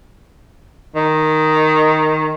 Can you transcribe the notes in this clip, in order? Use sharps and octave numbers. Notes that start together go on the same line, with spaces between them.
D#3